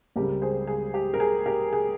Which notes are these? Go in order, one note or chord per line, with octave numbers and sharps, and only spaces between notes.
C#2 C#3 G3 C4 G4 A#4
G#4 C5
G#4
G4
A#4
G#4
G4 A#4
G#4